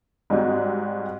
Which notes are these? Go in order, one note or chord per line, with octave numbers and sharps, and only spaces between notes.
G#2 G3 G#3 C4 F#4